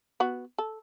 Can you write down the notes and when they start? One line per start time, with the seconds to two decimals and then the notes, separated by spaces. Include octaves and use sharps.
0.20 B3 F#4
0.58 A4